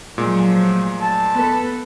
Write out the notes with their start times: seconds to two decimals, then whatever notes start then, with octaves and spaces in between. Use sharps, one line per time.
0.18 A#2 F3 F#3 G#3 A3
1.01 A5
1.33 B3 A4 B4